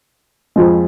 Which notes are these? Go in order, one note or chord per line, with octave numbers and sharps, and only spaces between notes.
F2 F3 G#3